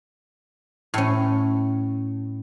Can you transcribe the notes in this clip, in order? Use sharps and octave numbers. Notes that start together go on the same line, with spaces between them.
A2 C#4